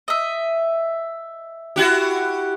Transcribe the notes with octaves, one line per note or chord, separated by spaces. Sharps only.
D#5 E5
E4 F#4 G4